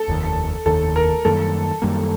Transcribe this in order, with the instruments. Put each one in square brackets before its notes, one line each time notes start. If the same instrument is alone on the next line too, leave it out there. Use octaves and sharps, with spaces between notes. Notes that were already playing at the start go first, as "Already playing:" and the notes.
Already playing: [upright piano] A4
[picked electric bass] F1 D#2 D#3
[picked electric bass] F1 D#2 D#3 [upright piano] A4
[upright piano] A#4
[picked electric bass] F#2 D#3 G3 A#3 [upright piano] A4
[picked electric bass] F#2 D#3 G3 A#3